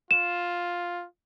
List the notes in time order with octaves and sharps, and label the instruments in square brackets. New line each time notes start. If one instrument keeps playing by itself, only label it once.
[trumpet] F4 [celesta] E7